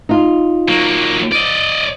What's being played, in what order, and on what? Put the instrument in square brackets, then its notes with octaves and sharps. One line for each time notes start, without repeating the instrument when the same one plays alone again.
[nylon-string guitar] D#4 F4
[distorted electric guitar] F#3 A#3
D5 D#5